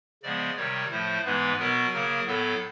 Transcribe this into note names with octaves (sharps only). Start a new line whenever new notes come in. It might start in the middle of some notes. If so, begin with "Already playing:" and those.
C#3 F3 G#3 B3 D5
C3 D#3 G3 C#5
A2 F3 A3 C5
G#2 E3 G#3 B3 B4
B2 F#3 B3 A#4
C#3 F#3 A#3 A#4
A2 F#3 B3 A4